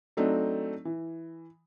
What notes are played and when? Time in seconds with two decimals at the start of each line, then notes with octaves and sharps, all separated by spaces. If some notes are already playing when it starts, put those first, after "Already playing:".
0.17 F#3 A3 C4 D4 D#4
0.85 E3